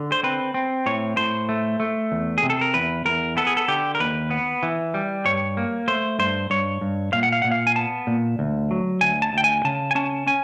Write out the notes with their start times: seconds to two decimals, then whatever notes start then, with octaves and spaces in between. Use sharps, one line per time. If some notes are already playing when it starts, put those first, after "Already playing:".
Already playing: D3
0.12 C5
0.23 C4 B4
0.54 C4
0.86 A2 C#5
1.17 A2 C5
1.49 A3
1.80 A3
2.12 E2
2.38 G#4
2.43 C3
2.50 A4
2.61 A#4
2.74 E2 B4
3.05 E2 A#4
3.37 B3 A4
3.47 G#4
3.57 A4
3.68 D3 G4
3.95 A#4
4.00 D#2 B4
4.31 B3
4.63 E3
4.94 G3
5.26 G2 C#5
5.57 A#3
5.88 A3 C5
6.19 G2 C5
6.50 G2 C#5
6.81 G2
7.13 A#2 F5
7.23 F#5
7.32 F5
7.42 A#2 F#5
7.52 F5
7.67 G#5
7.76 B3 A5
8.07 A#2
8.39 D2
8.71 F#3
9.01 D2 G#5
9.22 A5
9.33 D2 G5
9.44 G#5
9.65 C#3 A5
9.91 G#5
9.95 C#4 A5
10.27 C#4 G#5